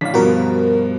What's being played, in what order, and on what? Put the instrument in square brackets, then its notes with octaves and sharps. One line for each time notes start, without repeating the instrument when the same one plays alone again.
[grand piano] A1 D4 [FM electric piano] F5 B6
[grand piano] G2 B2 F3 [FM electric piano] F#4 A#4